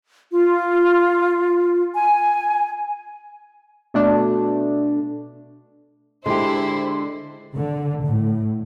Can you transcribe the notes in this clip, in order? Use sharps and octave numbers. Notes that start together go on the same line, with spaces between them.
F4
G#5
B2 A3 D4
D3 G#3 E4 G4 C5 C6
D3
A2